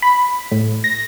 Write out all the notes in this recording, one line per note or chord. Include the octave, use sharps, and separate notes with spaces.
B5
A2
A#6